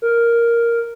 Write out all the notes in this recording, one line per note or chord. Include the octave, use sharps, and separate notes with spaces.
A#4